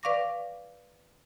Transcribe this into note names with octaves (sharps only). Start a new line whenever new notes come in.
B4 D5 F5 C#6 D6 A#6